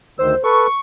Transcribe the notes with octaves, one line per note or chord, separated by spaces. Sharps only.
D2 D#3 C5 E6
A4 B4 C#6